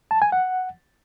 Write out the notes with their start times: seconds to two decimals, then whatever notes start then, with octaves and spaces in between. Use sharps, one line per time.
0.11 A5
0.22 G#5
0.32 F#5